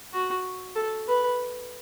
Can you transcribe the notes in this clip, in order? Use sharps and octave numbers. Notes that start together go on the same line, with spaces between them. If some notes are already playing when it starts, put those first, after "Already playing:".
F#4
A4
B4